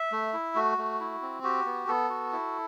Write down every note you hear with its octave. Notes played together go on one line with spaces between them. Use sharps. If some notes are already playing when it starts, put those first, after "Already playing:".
Already playing: E5
A3
E4
A3 F#4
A3
E4
C4
F#4 G4
B3
B3 A4
F#4
E4